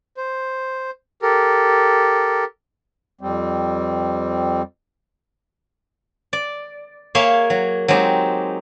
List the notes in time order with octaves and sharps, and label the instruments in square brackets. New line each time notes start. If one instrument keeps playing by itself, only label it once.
[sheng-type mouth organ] C5
G4 A4 A#4
[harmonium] F2 G3 C4
[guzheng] D5
A#3 G#4 C#5 E5 F5
F#3
F#3 G#3 C4 D#4 G4